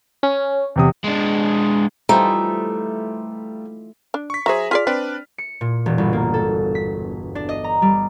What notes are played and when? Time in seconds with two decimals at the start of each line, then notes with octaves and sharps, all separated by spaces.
0.23 C#4
0.76 E2 C3 D#6
1.04 G#3 D4
2.09 E3 F3 G3 A3 D#4 F4 G5 A#5
4.14 D4
4.30 C#6 B6
4.46 F#3 G#4 C5 E5 A#5
4.71 F4 G#4 D5 F6 B6
4.87 C4 D4 B4 D5
5.38 C#7
5.61 A#2
5.86 E1
5.98 G1
6.13 A#3
6.34 A4
6.75 B6
7.35 D4
7.49 D#5
7.64 A#5
7.82 G3